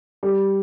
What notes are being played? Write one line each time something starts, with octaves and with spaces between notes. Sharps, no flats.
G3